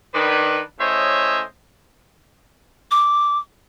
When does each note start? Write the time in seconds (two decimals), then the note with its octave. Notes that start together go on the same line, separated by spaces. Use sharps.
0.15 D#3 D4 B4
0.80 A2 C#3 C5 C#5 D#5 E5
2.91 D6